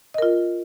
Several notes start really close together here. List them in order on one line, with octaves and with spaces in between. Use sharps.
D#5 A#4 F4